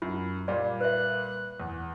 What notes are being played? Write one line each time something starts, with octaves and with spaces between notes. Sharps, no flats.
F#2 F4
A#2 G3 D5
B4 E5 F#6
E2